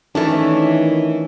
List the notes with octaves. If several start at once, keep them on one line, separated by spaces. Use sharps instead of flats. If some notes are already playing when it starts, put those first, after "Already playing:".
D#3 E3 A3 C#4 D4